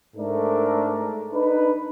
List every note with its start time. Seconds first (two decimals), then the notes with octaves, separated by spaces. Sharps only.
0.16 G#2 A3 D4 A4 A#4
1.33 D4 D#4 B4